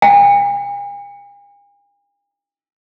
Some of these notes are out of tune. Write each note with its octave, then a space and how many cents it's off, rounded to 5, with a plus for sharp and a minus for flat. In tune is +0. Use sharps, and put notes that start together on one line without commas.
G#5 -45